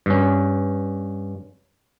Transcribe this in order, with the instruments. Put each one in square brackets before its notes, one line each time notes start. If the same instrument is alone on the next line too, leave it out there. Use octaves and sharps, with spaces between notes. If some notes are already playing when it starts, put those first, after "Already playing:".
[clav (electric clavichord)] G2 C#4